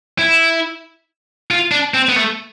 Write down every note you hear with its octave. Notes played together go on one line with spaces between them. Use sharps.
E4
F4
D4
C4
B3
A3